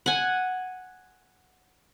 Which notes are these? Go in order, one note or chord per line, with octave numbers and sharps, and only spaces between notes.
F#5 G#5